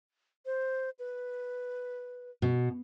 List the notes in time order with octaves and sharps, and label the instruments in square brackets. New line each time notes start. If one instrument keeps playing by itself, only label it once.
[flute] C5
B4
[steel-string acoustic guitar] B2